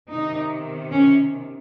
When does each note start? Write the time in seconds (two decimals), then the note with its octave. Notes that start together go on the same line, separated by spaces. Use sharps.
0.10 C3 D#3 D#4
0.91 C#4